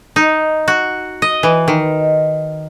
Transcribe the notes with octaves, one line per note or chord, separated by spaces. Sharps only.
D#4
F#4
D#5
E3
D#3